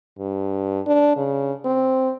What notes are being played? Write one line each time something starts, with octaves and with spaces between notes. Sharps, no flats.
G2
D4
C#3
C4